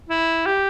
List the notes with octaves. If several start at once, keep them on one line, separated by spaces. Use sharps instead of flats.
E4
G4